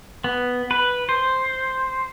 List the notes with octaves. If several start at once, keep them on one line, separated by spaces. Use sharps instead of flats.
B3
B4
C5